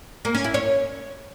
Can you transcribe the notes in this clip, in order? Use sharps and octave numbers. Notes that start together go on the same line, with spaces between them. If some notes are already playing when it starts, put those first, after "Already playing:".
A#3
C#4
E4
C#5